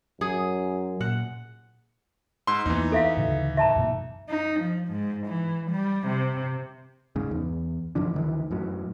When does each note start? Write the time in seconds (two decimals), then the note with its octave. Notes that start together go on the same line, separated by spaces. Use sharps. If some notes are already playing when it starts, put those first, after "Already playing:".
0.21 F#2 F#3 G#4
1.01 A#2 F#5
2.47 G#2 C6 E6
2.66 E2 E3 A#3 B3 D#4
2.92 A4 E5 F5
3.17 D2 A2 C#3
3.57 E5 A5 A#5
3.76 F#2 B2 A#3
4.29 D#4
4.60 F3
4.88 G#2
5.27 E3
5.71 G3
6.07 C3
7.16 G#2 C#3
7.31 E2
7.95 F#2 E3 F3 D4
8.14 D2 D#3 E3
8.51 F#2 A2 F#3